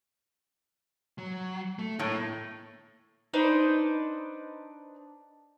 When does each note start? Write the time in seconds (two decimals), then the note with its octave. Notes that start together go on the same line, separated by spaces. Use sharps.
1.18 F#3
1.79 A3
1.99 A2 A#3 C#5
3.34 D4 D#4 B4 C5